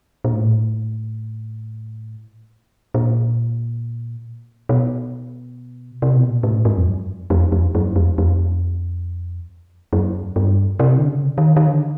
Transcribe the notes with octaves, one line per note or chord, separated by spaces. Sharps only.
A#2
A2
A#2
B2
C3
B2
A#2
A2
G#2
F2
F#2
F2
F2
F#2
F2
F2
F#2
G2
C3
D3
C#3
D#3
D#3
D3